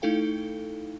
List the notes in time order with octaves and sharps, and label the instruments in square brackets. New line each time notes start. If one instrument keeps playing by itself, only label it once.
[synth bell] A3 D#4 E4 A4 F5 G5